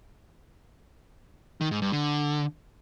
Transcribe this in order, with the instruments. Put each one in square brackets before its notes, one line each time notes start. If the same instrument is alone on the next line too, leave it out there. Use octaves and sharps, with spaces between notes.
[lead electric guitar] D#3
G#2
G2
D3